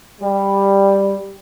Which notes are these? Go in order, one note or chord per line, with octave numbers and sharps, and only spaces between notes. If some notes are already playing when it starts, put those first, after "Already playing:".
G3